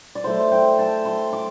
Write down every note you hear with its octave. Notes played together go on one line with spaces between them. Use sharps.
D5
F#3 A3 E4 C5
G5
A5
C6
D6